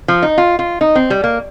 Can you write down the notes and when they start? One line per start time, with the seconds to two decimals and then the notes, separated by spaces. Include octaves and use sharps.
0.08 F3
0.22 D#4
0.38 F4
0.59 F4
0.81 D#4
0.95 C4
1.10 G3
1.24 A#3